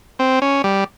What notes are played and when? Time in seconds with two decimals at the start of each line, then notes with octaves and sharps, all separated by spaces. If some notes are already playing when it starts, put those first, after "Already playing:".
0.19 C4
0.42 C#4
0.64 G3